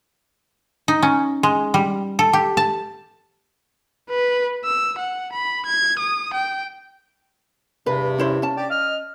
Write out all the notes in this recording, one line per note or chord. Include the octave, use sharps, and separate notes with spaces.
D#4
C#4
G#3
G3
A4
G4
A5
B4
E6
F#5
B5
G#6
D#6
G5
E2 G2 C3 B4
C#4 E4 C5
C#4 A5
D4 G4 D5
D#5 F6